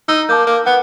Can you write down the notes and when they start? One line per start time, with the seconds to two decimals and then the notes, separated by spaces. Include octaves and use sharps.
0.08 D#4 E6
0.29 A#3 A5 D6 G6
0.47 A#3
0.66 B3 F#5